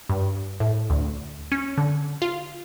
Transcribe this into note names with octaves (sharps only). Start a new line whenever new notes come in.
G2
A2
D2
C#4
D3
F4